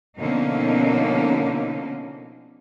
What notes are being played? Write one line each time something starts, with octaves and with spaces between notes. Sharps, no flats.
B2 D3 F3 A#3 C#4 D#4